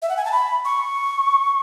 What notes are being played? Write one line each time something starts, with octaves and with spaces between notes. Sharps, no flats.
E5
F#5
G#5
A5
B5
C#6